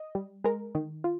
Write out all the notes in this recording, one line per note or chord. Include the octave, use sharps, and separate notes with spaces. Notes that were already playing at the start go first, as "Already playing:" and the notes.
Already playing: D#5
G3
G#3 A#4
D#3
F4